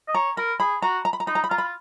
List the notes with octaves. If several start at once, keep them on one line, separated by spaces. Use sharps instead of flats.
D#5
C#5 A#5
A#4 B5
G#4 B5
F#4 A#5
A#5
B5
A#5
D#4 B5
A#5
B5
F4 A#5
B5
F4